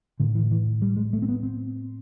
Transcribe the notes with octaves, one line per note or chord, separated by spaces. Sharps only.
A2 D3
E3
E3
G3
G#3
A3
C4
B3
C4